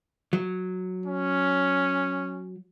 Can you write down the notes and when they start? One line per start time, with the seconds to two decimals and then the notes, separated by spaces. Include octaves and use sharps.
0.33 F#3
1.06 C#4